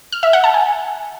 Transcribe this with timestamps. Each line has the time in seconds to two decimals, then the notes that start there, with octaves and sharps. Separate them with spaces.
0.12 F6
0.23 E5
0.33 F#5
0.44 A5
0.54 G#5